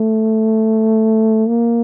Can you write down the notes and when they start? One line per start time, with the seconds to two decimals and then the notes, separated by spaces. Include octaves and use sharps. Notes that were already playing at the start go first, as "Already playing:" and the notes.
Already playing: A3
1.48 A#3